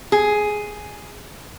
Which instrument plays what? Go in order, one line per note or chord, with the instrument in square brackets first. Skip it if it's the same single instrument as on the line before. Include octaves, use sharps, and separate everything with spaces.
[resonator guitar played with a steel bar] G#4